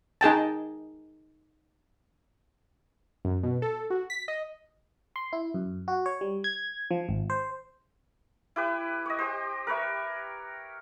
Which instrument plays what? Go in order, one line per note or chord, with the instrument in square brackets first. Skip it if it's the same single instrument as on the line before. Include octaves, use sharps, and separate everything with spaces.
[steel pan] D#4 G#4 G5 A5
[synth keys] F#2
B2
A4
F#4
B6
D#5
[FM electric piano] C6
E4
F#2
F#4
C#5
G3
G#6
F3
G#1
C5
[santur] E4 G4 B4
C#5 D#5
G4 C5
A#4 B4 C#5 E5